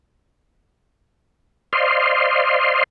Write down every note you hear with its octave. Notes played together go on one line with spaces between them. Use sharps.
C5 D5 D#5 F5 C6